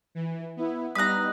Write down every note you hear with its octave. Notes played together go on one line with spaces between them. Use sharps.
E3
B3 E4
G3 B3 D#4 A#5 B5 D#6 F#6